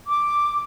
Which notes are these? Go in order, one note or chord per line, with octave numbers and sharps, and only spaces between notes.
D6